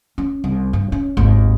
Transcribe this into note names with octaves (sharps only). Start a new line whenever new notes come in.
C#4
C2
G2
C#4
G#1 D#2